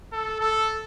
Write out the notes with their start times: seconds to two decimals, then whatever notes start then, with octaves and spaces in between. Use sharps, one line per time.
0.12 A4
0.40 A4